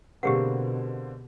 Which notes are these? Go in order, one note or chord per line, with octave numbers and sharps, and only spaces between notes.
B2 D3 A#3 C4 G4 G#4 F#5